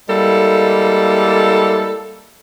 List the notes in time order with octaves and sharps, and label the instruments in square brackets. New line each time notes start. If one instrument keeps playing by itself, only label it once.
[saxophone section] G3 G#3 A#3 E4 A4